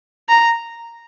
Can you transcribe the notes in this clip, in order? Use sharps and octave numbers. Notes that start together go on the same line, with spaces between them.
A#5